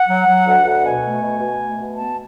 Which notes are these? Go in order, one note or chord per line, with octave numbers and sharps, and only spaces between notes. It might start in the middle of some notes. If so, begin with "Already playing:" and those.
Already playing: F#5
F#3
F#3
D2
D2
B2 G#5
A3
B2
B2
A3
B2
B3 A5